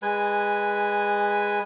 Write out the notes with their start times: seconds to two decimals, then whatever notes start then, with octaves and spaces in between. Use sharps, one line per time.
0.02 G#3 B4 G#5